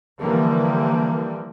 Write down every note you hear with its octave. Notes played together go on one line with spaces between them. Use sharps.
D3 E3 F3 G3 A#3